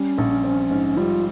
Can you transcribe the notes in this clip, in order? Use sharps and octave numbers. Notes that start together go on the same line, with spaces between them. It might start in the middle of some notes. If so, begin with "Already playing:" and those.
Already playing: G3 C#4
A#1
C4
G#2
G3 F4